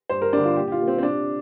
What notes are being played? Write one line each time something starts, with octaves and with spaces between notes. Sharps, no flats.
G2 C5
A#4
D3 G3 A#3 D4
F4
A#2 G4
G4
F4
G3 A#3
C4
C4
C3 D4